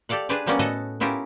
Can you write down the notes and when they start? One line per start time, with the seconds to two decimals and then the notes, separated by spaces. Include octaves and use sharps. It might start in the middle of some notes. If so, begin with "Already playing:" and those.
0.09 G4 A4 D5 F5 F#5
0.29 D4 G4 G#4 B4 C5 D5
0.46 F3 G3 A#3 B3 C#4 D5
0.59 A2 F#4 A4 D#5 F#5
1.00 B3 C#4 E4 F4 G4 A#4